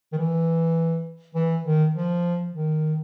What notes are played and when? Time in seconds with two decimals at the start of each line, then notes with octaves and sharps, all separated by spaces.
0.13 D#3
0.17 E3
1.35 E3
1.64 D#3
1.94 F3
2.53 D#3